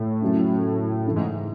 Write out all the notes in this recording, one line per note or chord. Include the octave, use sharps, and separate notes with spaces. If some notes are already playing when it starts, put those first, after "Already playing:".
Already playing: A2
F#2 C#3 F#3 C#4
F#2 C#3 E3 A3
G#2